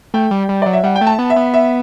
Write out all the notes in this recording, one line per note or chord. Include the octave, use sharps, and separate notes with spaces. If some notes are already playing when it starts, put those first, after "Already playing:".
A3 G5
G3
G3
F#3 D5
E5
G3 F#5
G5
A3
A5
B3
E5
B3
E5